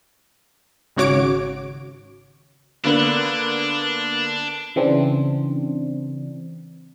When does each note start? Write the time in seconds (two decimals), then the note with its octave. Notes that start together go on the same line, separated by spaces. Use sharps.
0.96 G#1 C#3 F#4 C#5 D6 D7
2.84 D3 A#3 B3 D4
4.76 C#3 E3 C4 D4